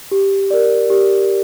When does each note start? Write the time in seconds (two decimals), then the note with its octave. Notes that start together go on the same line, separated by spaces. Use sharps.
0.11 G4
0.51 A#4 D5
0.90 G4